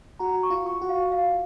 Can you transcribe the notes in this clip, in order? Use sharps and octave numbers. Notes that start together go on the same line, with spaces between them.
F#4 A#5
C#6
F4
C#6
F#4
F5
F5